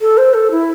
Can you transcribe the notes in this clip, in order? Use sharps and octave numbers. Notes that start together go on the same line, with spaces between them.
A4
C5
A4
E4